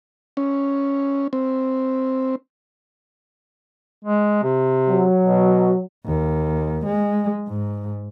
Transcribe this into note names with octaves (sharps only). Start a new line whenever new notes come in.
C#4
C4
G#3
C3
F#3
B2
D#2
G#3
G#2